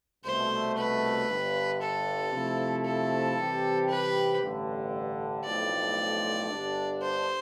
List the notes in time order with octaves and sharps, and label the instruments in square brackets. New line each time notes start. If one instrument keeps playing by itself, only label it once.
[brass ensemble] C2 B2 A3 [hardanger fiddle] C5
[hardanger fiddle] B4
[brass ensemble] G1 G2 D3
[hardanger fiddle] A4
[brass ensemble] C3 F3 A3 E4
[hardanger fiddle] A4
[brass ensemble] C3 E3 G3 C4 G4
[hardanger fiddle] B4
[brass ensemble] A1 G2 D3
[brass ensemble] B1 A2 F3 A3 C4 [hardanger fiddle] D5
[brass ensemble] G1 G2 D3 G3 D4
[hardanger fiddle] C5